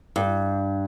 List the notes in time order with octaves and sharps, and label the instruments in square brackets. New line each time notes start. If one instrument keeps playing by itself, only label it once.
[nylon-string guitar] G2